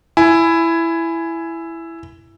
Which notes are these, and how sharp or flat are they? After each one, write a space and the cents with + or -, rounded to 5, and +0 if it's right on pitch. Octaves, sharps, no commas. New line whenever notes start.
E4 +10 G#5 +5